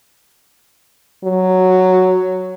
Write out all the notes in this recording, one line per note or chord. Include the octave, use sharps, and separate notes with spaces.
F#3